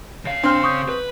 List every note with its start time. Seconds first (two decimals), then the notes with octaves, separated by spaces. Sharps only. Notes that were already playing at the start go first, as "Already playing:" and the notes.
0.25 C#3 F5
0.43 C4 D4 C6 F6
0.63 C#6 D#6 G6
0.89 B4